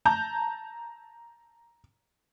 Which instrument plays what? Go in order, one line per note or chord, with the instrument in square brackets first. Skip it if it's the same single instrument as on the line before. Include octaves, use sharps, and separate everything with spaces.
[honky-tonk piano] A5 A#5 G6